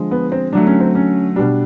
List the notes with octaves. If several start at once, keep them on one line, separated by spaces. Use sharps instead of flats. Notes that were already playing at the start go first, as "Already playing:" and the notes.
Already playing: D3 F3 G#3
B3
C4
D3 F#3 A3 D4
C#4
C4
C#4
B2 G3 D4